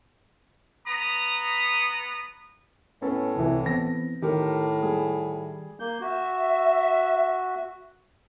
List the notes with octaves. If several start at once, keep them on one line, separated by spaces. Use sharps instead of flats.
B3 A#5 B5 D#6
A2 B3 C#4 A4
C2 E3
E3 B3 C4 A#6
A2 D#3 G4 A#4
G3 G#4
A#3 G6
F#4 E5